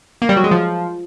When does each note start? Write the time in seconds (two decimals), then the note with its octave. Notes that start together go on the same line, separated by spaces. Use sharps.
0.22 A#3
0.29 G3
0.37 F#3
0.44 G#3
0.51 F3